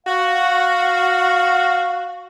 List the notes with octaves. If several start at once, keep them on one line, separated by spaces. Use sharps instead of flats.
F#4 F5